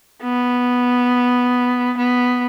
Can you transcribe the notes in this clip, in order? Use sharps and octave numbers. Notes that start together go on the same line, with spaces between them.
B3
B3